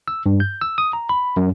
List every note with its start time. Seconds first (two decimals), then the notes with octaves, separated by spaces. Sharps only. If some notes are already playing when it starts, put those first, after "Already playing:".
0.08 E6
0.26 G2
0.40 G6
0.61 E6
0.78 D#6
0.93 A#5
1.09 B5
1.36 F#2